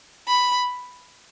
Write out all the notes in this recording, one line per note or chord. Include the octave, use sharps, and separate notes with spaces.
B5